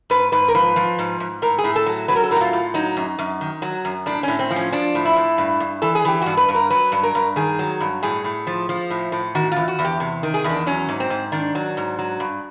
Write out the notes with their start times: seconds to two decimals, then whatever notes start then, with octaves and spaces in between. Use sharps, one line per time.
0.10 G#2 B4
0.32 G#2 B4
0.48 A#4
0.55 F3 B4
0.76 F3
0.99 G#2
1.20 G#2
1.42 A2 A#4
1.58 G#4
1.64 A2
1.76 A4
1.86 F#3
2.08 F#3 B4
2.16 A#4
2.23 A4
2.31 A2 A#4
2.37 F#4
2.41 F4
2.53 A2
2.74 F#3 D#4
2.97 F#2
3.19 F#2
3.41 D#3
3.62 F#3
3.85 F#2
4.06 A2 D4
4.23 A2 C#4
4.39 C4
4.51 F3
4.56 C#4
4.72 F3 D4
4.95 A2
5.05 E4
5.16 A2
5.38 G2
5.60 G2
5.82 E3 A4
5.95 G#4
6.05 E3 G4
6.22 G2 F#4
6.37 B4
6.48 G2
6.55 A#4
6.70 F#3 B4
6.92 G2
7.03 A#4
7.15 G2
7.36 D#3 G#4
7.59 F#3
7.81 G2
8.03 A2 G#4
8.24 A2
8.47 F3
8.69 F3
8.90 A2
9.12 A2
9.35 D#3 F#4
9.52 E2 F4
9.68 F#4
9.79 E2
9.85 G4
10.00 C3
10.23 D#3
10.34 G#4
10.44 E2
10.50 D4
10.67 F#3 C#4
10.89 G#2
11.00 C4
11.10 G#2
11.32 D#3 D4
11.55 F#3
11.77 G#2
11.99 F#3
12.20 G2